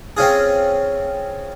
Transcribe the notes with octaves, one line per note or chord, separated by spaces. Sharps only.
C4 C#4 F4 G#4